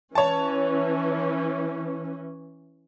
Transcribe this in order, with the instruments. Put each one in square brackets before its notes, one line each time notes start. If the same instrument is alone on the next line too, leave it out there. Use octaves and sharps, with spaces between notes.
[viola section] E3 C#4 [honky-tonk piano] C#5 A5